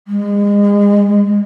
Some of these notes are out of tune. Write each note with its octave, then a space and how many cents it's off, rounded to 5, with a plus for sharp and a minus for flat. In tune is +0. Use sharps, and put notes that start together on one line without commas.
G#3 -35